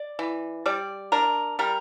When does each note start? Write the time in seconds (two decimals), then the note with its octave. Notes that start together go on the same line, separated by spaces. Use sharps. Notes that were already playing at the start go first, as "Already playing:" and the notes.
Already playing: D5
0.19 E3
0.66 G3 D5
1.12 D4 A#4
1.59 G3 A#4